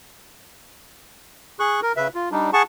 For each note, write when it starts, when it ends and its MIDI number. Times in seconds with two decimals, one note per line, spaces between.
1.60 1.80 68
1.60 1.80 85
1.60 1.80 90
1.82 1.92 70
1.97 2.08 49
1.97 2.08 71
1.97 2.08 76
2.15 2.29 65
2.32 2.50 55
2.32 2.50 62
2.32 2.50 63
2.53 2.63 68
2.53 2.63 78
2.53 2.63 81
2.53 2.63 85